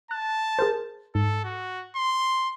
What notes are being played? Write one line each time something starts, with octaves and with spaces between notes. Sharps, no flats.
A5 F#6
G#4 A#4 C5
G#2 A4
F#4
C6